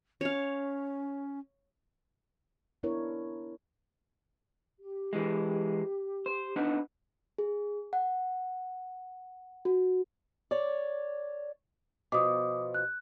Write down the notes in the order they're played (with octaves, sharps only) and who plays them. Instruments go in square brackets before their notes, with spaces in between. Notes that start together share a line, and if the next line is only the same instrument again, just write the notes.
[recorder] C#4 [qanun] C#5 F5
[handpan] B3 D4 E4 A#4 C#5
[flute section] G4
[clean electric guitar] E3 G#3
C5
B3 D4 D#4
[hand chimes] G#4
F#5
F#4
[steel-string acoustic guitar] C#5 D5
[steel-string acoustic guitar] B2 F3 [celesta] D6 D#6
[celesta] F#6